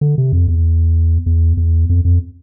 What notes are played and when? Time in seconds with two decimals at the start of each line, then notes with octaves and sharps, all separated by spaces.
0.01 D3
0.18 C3
0.33 F2
0.48 E2
1.26 E2
1.57 E2
1.89 F2
2.05 F2